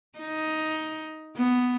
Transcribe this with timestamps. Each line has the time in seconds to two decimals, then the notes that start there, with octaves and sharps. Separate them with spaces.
0.19 D#4
1.37 B3